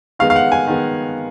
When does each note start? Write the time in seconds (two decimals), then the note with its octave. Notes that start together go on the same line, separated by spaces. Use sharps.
0.19 D#3 G#3 B3 F5
0.30 F5
0.36 F#5
0.52 G#5
0.68 D#3 G#3 B3